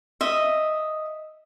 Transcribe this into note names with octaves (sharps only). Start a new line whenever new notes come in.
D#5 E5